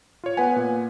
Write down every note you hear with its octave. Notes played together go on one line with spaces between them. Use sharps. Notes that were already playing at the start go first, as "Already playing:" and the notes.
F4 C#5
B3 B4 F#5 G#5
A#2